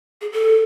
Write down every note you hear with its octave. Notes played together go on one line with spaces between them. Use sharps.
G#4
A4